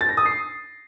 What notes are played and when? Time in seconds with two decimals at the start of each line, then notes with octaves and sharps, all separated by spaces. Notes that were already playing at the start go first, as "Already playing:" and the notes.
0.01 A6
0.09 A#6
0.17 D#6
0.26 C7